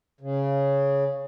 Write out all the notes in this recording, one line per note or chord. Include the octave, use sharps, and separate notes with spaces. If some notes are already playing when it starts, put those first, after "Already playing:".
C#3